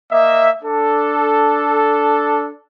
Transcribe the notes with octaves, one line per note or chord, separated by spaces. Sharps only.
A#3 D#5 E5
D4 A4